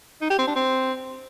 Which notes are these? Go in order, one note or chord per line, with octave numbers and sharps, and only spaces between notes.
D#4
G4
C4
D4
C4